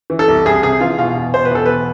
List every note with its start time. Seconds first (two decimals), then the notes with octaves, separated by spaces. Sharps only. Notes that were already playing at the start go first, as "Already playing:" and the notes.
0.10 E3
0.19 A4
0.28 C2
0.46 C2 G#4
0.63 C3 G#4
0.81 E3 F4
0.98 B2 F4
1.16 E2
1.34 B2 C5
1.45 B4
1.51 E2 A4
1.66 B2 B4